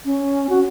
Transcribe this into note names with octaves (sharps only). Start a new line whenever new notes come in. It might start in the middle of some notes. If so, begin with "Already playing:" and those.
C#4
F#4